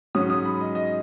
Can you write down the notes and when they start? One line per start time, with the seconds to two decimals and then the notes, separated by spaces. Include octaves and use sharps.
0.15 G#2 F#3 C#4 D#6
0.30 D#6
0.45 B5
0.61 D#5
0.75 D#5